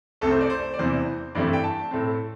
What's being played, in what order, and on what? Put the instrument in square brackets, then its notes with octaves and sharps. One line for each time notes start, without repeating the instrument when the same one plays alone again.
[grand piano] C2 C3 A3 A4
C5
D5
C5
D5
E2 C3 E3 C5
G2 E3 A3 C4 D5
G5
A5
A2 A3 C4